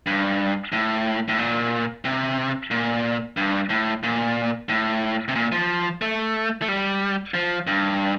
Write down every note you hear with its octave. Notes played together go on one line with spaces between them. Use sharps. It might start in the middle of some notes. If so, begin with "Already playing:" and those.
G2
A2
A2
A#2
C3
A#2
G2
A2
A#2
A2
C3
A#2
F3
A3
A3
G3
F3
G2